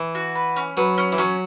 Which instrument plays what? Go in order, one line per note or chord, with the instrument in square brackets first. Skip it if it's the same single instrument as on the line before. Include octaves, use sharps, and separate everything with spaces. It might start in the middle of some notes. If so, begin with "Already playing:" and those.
Already playing: [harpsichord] E3
[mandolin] F#4
B4
C#4
[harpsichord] F#3 [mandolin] B4
[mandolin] C#4
[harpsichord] E3
[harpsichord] F#3 [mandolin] C#4